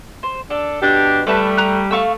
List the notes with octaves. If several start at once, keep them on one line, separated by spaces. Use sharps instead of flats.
C5
D4 A4
B2 D4 G4
G3 A3 B4 E5 A5
A#5 F#6
A3 F5 C#6 E6